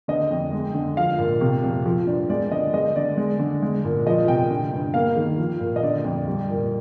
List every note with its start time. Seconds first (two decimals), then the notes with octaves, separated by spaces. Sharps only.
0.08 D3 D#5
0.31 F2
0.53 G#3
0.74 D3
0.97 F3 F5
1.19 A#2
1.41 C3
1.63 F2
1.86 F3
2.07 G2 D5
2.29 G#3 D5
2.52 D3 D#5
2.73 G#3 D#5
2.96 D3 D5
3.17 G#3
3.39 D3
3.62 G#3
3.84 A#2
4.06 F3 D#5
4.28 C3 G5
4.51 D3
4.72 G2
4.94 A#3 F5
5.16 D#3
5.38 F3
5.61 A#2
5.76 D#5
5.83 D3 D5
6.04 F2
6.27 G3
6.49 A#2